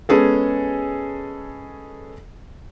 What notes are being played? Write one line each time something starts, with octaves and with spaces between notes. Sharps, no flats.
G#3 B3 C#4 G#4 A4